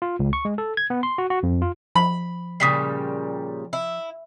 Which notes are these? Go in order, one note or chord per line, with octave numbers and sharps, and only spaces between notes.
F4
C#2
C#6
G#3
A4
G#6
B3
C6
F#4
F#4
F2
F4
F3 B5
A#2 C#3 G3 D#6 B6 C7
E4